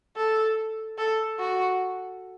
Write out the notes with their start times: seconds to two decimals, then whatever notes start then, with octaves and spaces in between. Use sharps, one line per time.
0.16 A4
0.98 A4
1.39 F#4